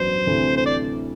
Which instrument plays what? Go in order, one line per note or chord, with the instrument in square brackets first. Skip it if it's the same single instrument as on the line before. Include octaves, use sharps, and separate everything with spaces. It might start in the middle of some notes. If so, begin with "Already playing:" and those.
Already playing: [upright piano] A1 G2 F#3 B3 D4 [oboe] C5
[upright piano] D2 C3 E3 A3 D4
[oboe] C5
D5